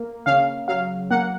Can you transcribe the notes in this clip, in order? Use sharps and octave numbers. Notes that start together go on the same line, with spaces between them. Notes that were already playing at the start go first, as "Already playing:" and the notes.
Already playing: A#3
C#3 F5
F#3 F5
A#3 F#5